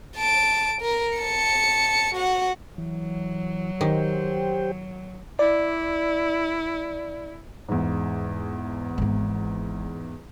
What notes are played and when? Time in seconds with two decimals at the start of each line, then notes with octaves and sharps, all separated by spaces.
0.17 A5 D7
0.81 A#4
1.18 A5 C#7
2.14 F#4 F#5
2.78 E3 F#3
3.81 D#3 G4 C5 G5
5.39 E4 D5
7.69 E2 G#2
8.98 G#1 B3